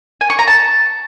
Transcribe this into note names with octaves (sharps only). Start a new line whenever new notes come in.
G#5
C#6
A#5
A5